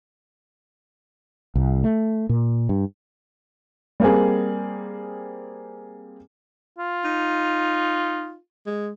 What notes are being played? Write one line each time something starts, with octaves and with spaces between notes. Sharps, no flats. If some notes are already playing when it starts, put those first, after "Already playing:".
C2
A3
A#2
G2
G3 A#3 C4 G#4
F4
D#4
G#3